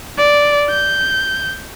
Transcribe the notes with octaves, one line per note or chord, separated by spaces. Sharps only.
D5
G6